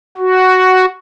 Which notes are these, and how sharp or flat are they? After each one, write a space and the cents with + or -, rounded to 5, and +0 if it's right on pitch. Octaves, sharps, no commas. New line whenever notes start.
F#4 +5